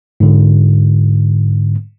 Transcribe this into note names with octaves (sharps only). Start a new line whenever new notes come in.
G#2 D3